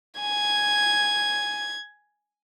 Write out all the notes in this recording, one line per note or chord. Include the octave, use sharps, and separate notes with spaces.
G#5 G#6